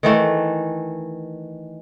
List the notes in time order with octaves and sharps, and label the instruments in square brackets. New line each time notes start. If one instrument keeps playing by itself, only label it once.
[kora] D#3 E3 A3